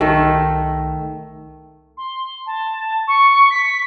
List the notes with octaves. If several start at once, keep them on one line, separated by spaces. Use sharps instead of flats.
C2 D#3 A3
C6
A5
C#6
B6